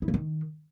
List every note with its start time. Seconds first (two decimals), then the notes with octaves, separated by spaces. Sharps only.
0.02 E4
0.08 A#3
0.14 D#3